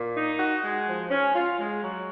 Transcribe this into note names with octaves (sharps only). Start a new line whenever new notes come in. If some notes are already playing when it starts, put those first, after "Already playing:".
Already playing: A#2
D#4
F#4
G#3
F3
C#4
F4
G#3
F#3